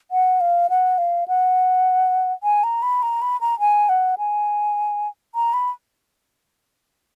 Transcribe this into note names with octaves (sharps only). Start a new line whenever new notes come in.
F#5
F5
F#5
F5
F#5
G#5
A#5
B5
A#5
B5
A#5
G#5
F#5
G#5
A#5
B5